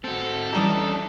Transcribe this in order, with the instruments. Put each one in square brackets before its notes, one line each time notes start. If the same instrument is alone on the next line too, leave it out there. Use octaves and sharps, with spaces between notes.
[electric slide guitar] C4 F#4 [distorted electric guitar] A4
[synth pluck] E3 G3 G4 [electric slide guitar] C#4 D4 E4 [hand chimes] A#5 D#6